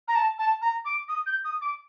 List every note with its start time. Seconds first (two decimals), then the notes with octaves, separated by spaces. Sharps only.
0.08 A#5
0.15 A5
0.39 A5
0.62 A#5
0.85 D6
1.09 D#6
1.26 G6
1.45 D#6
1.61 D6